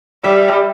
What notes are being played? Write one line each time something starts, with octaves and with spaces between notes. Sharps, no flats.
G3 E5